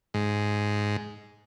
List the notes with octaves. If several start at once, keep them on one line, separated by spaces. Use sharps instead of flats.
G#2